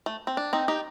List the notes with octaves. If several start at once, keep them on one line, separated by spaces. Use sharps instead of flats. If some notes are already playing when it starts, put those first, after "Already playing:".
A3
C4
D4
C4 D#4
D#4 G4